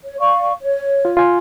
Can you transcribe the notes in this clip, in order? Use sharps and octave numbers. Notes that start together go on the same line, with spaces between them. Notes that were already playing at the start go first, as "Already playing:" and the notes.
C#5
D5 F5 C#6
C#5
F4
F4 G#5 C6